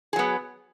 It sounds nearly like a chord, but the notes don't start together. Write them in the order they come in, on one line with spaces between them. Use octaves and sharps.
G#4 F#3 B3